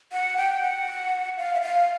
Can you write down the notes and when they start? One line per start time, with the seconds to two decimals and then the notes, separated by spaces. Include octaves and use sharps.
0.12 F#5
0.37 G5
0.62 F#5
1.37 F5
1.54 E5
1.61 F5